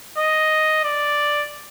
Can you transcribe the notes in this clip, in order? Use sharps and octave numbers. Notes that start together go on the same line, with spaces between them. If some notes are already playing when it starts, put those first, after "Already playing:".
D#5
D5